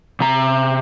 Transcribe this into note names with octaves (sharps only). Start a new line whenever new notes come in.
C3 A#5